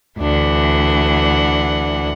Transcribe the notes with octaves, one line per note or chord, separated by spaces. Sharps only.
D2 E3 D4 F#5